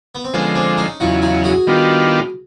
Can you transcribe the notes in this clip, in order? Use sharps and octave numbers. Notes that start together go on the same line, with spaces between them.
B3
C4
D3 F3 G#3 B3 C#4
C4 D4
C#4 D#4
E2 C#3 F#3 D#4 F4
D#4 F4
F#4 G#4
D#3 G3 B3 D4 F4